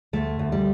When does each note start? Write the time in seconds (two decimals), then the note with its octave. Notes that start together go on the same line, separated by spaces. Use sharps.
0.13 D2 A3
0.39 D2
0.52 G3